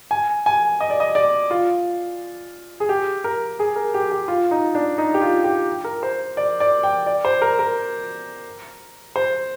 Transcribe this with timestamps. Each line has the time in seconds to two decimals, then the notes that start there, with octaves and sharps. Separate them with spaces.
0.11 G#5
0.46 G#5
0.80 D#5
0.90 D5
1.00 D#5
1.15 D5
1.51 F4
2.80 G#4
2.89 G4
3.24 A#4
3.59 G#4
3.76 A#4
3.94 G4
4.11 G4
4.28 F4
4.51 D#4
4.75 D4
4.98 D#4
5.14 G4
5.21 F4
5.44 G4
5.84 A#4
6.03 C5
6.37 D5
6.60 D5
6.83 G5
7.06 D5
7.25 C5
7.42 A#4
7.59 A#4
9.16 C5